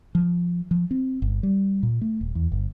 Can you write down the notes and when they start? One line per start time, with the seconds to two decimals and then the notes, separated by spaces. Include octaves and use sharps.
0.15 F3
0.71 F3
0.91 C4
1.22 G1
1.43 G3
1.83 A#2
2.01 A3
2.21 D#1
2.35 E2
2.52 G1